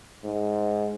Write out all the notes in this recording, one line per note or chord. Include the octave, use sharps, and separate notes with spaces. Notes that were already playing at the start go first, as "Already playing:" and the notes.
G#2